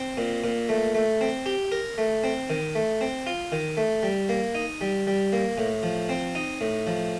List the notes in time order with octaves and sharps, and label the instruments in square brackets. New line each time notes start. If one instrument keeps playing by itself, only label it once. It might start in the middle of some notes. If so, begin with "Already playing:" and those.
Already playing: [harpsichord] C4
A#2
A#2
A3
A3
C4
G4
A#4
A3
C4
D#3
A3
C4
F4
D#3
A3
G3
A#3
D#4
G3
G3
A#3
A2
F3
C4
D#4
A2
F3